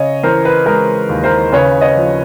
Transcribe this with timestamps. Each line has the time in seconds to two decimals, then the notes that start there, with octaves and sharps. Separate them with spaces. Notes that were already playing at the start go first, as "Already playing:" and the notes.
Already playing: C#3 C#5 D#5
0.23 E3 A#4 C5
0.45 B4
0.66 G#3 A#4
1.09 D#2
1.24 A#4 C5
1.52 C#3 B4 C#5
1.81 C#5 D#5
1.97 F3